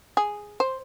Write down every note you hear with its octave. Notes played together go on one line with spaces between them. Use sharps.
G#4
C5